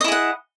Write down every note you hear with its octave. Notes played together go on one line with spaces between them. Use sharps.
E4 G#4 D#5 F#5